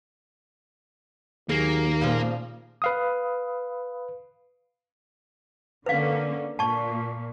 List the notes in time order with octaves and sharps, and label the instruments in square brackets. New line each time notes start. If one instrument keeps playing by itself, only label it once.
[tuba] D#2 [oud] F#3 G#4 [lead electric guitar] A#3
[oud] A#2 C#3 F3
[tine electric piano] B4 F5 D#6
[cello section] D3 A#3 C#4 [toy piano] B4 F5
[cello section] A#2 [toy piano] A5 C#6